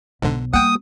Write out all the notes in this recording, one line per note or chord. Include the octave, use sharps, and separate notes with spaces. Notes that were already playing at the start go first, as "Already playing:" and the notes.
B1 G#2 D3
G3 A#3 F#5 G5 D#6